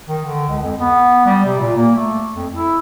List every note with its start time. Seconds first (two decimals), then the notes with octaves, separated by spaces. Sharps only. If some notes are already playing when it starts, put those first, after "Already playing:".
0.08 D#3
0.25 D3
0.48 C#2
0.64 F2
0.79 B3
1.26 G3
1.46 C3
1.59 A#2
1.77 A#3
1.96 A3
2.35 F2
2.53 E4